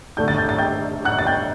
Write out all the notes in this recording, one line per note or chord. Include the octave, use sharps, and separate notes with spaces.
D3 A3 D4 G6
A6
G6
A6
G5 G6
F#5 F#6
A6
G5 G6